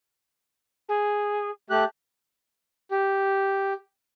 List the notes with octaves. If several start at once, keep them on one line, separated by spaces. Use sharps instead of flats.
G#4
A3 G4 F#6
G4